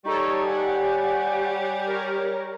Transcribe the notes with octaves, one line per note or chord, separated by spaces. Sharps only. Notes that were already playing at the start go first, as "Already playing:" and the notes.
G3 D#4 G4 A4 C#5 C#6
C#5 F#5 G#5
A#4 C#5